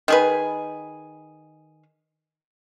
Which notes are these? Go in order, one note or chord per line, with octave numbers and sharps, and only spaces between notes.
D#3 G#4 B4